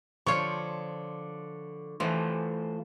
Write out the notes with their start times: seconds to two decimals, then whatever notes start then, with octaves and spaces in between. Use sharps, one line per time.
0.27 D3 F3 F4 C5 C#5 C#6
2.00 E3 A3 F4 C5